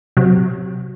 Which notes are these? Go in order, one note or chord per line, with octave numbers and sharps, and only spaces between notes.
C3 F#3